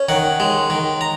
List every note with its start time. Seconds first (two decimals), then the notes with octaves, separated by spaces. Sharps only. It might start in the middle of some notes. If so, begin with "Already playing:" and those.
Already playing: C#4
0.09 D#3 F#5
0.40 G#3
0.70 D#3
1.01 A#5